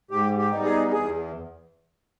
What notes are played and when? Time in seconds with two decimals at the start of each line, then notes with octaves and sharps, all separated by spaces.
0.11 G#2 G4
0.38 G4
0.52 G3 B3 D#4
0.64 G#4
0.91 E2 G#4